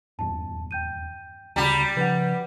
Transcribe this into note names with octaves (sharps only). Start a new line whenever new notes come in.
D#1 E2 G2 A5
G5 G6 D#7
D2 C#3 G3 G4 A#5 B5
C#3 F3 B4 F#5